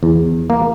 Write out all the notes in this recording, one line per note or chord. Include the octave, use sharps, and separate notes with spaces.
E2
A#3